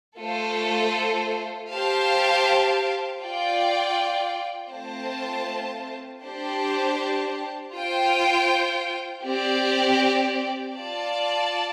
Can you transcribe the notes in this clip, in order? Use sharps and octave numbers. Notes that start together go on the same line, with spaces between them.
A3 F4 A4 C5
G4 C5 F5 A5
F4 D5 G5
A3 C4 F4 C5 A5
D4 G4 C5 A5
F4 C5 G5
C4 G4 D5
F4 D5 A5